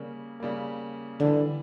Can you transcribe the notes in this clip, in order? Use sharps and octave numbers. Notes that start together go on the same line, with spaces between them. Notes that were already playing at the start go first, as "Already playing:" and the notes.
Already playing: C#3 G3 A#3
C#3 G3 A#3
D3 E3 G3 D4